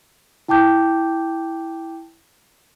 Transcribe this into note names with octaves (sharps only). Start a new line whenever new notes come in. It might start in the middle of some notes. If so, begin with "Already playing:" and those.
E4 G5 A5 D6 G6